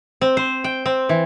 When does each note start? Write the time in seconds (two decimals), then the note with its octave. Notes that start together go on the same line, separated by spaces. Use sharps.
0.21 C4
0.37 C5
0.64 G5
0.86 C4
1.09 E3